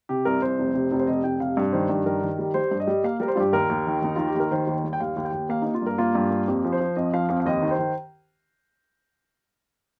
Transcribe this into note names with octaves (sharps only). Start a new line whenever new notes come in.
C3 G4
C2 A#4
C2 C5
F1
C3
F1
C5
C3 D#5
F1 G5
C3 F5
G2
D#3 C5
G2
D#3 A#4
D#3
G3
G3 C5
G2
D#5
G3
A#3 F5
G3 A#4
C5
G2 F4 G4
D#2 A#4
D#2
D#3
D#2 D#4
D#3 F4
G4
D#2 A#4
D#3 C5
D#2
G3
G5
D#2 F5
D#2
G5
D#2
A#3 F5
A#3 D#4
F4
G2 A#4
A#3 F4
G2
A#3
F2 G4
F3
C5
F3
F2 D#5
F3 F5
F2 F5
F5
D#2 D#5
D#3
C5
D#3